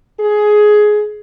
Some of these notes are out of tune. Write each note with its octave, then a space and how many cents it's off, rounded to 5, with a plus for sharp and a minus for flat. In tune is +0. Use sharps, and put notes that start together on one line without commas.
G#4 +15